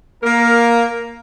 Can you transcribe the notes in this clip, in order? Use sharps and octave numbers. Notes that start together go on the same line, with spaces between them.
A#3 A#4